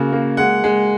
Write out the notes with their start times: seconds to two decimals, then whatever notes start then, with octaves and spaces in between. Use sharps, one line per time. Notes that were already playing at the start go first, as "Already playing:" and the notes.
Already playing: C#3 A#3 F#4
0.13 A#3
0.37 G#3 F#5
0.64 G#3